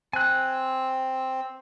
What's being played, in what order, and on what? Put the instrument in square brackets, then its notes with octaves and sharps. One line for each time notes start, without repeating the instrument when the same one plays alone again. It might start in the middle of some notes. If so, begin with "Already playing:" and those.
[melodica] C4 [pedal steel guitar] G#5 F#6